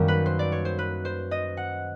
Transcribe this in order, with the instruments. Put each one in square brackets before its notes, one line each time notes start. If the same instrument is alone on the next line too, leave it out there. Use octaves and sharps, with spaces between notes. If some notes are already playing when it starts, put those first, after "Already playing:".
Already playing: [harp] F#2 D#3 G3 A#3 C#4
B4
C5
D5
C#5
C5
B4
C5
D#5
F#5